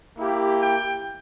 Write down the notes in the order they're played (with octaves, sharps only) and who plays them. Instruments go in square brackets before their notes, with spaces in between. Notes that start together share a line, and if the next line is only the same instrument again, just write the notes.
[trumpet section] A#3 E4 G4
G5